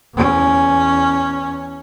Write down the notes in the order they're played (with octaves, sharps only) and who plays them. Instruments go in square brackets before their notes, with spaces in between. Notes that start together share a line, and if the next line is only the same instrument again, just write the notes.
[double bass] E2 C#4